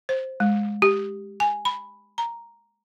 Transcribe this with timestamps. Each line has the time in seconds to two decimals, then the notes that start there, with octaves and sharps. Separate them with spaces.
0.09 C5
0.40 G#3
0.82 G4
1.40 G#5
1.65 B5
2.18 A#5